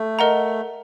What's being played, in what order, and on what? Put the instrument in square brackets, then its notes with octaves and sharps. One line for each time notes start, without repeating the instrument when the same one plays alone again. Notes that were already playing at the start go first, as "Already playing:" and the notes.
Already playing: [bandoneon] A3
[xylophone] A#4 D#5 F#5 A#5